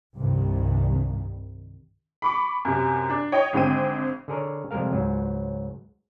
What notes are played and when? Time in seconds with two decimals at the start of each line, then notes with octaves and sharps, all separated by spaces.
0.15 C2 G2 D#3
2.22 B5 C#6 D6
2.65 F#2 C3
3.10 D4
3.32 C#5 D#5 G5 D#6
3.53 G#1 D3 G#3 C4 G5 D#7
4.28 D3 G#4 A#4 C#5
4.71 F2 C3 G3 G#3 A#4 F5
4.92 C#2 G#2 F#3